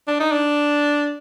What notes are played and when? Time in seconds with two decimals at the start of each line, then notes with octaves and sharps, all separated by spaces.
0.07 D4
0.20 D#4
0.32 D4